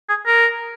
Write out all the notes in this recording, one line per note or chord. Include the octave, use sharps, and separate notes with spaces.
G#4
A#4